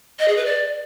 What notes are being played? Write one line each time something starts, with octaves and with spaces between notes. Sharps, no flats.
D#5
G#4
B4
D5